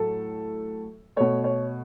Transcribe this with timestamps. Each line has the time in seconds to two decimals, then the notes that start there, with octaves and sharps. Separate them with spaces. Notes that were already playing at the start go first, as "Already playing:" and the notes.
Already playing: A2 F#3 A3 A4
1.16 B2 A3 C#5
1.44 C#5